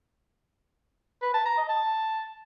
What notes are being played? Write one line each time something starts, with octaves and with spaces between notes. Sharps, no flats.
B4
A5
A#5
D#5
A5